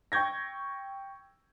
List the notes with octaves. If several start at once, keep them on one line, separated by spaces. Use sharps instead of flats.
G5 C#6 G6 G#6 A#6